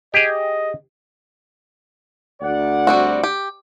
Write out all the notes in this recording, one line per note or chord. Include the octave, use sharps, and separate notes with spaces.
G4 G#4 D#5
D2 D5 F#5
G3 C4 F#4
G4